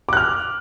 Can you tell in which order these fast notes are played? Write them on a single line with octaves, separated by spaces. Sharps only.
D6 F#6 F6